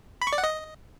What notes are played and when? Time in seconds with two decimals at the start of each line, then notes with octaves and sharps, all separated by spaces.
0.22 B5
0.27 C#6
0.33 D5
0.38 F#5
0.44 D#5